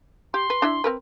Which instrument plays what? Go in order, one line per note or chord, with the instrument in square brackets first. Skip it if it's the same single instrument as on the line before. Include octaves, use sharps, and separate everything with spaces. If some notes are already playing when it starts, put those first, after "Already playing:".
[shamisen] G4 [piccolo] C6
[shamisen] B4
D4 E4 E5
C4 A#4 B4